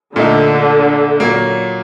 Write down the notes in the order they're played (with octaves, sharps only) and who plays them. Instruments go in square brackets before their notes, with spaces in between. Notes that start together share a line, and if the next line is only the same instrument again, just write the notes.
[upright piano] A#2 A3 D#4 [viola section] D3
[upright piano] A#2 F#3 A#3